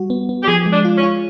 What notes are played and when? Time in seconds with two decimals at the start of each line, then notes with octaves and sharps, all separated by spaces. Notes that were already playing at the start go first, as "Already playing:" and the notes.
Already playing: G3 F#4
0.10 B3
0.29 B3
0.43 G4
0.48 F3 G#4
0.66 G#3
0.72 D4
0.85 F4
0.97 C#4
1.03 F4